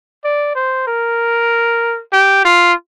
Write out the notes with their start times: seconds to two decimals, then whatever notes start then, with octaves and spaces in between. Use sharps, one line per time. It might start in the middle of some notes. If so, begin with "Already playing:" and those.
0.24 D5
0.55 C5
0.87 A#4
2.13 G4
2.45 F4